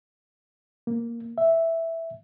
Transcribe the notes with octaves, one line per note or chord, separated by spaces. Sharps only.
A#3
E5